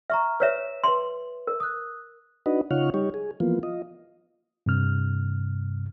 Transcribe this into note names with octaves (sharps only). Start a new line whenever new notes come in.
E5 A#5 C#6 F6
B4 C#5 E5 E6 B6 E7
B4 E5 C6
A#4
D#6 F#6
D4 D#4 F#4 B4 D#5
C#3 D#4 F4 C#5 F#5 F6
G3 D#4 G4 C#5
G#4
E3 F3 A#3 B3 F4
F4 D#5
G2 C3 F6